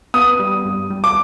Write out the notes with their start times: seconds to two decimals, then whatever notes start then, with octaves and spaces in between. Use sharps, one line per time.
0.14 B3 D#6
0.39 G3
0.65 G2
0.90 G3
1.04 D6